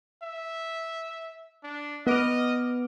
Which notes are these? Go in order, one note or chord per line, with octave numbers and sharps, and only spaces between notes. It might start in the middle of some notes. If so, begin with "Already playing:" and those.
E5
D4
B3 D#5 D6 F6